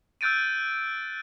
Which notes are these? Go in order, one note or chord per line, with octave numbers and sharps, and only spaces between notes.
E6 F#6 G6 A6 D7 D#7